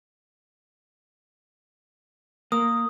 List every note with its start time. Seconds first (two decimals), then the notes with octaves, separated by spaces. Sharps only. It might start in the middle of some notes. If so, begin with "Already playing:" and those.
2.52 A#3 D#6